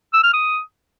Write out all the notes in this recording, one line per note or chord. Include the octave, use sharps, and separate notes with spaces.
E6
F6
D#6